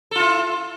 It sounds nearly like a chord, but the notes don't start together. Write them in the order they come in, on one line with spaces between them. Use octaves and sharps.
A4 F4 E4